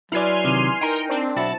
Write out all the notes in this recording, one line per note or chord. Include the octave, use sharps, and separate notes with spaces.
F#3 E4 B4 D5 G#5 C6 F6
C3 D#3
D#4 A#4 G5
C4 D4
B1 E4 F#4 A5